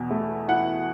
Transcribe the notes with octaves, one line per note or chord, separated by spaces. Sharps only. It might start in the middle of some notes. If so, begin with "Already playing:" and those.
Already playing: E2 B2
A3
E4 F#5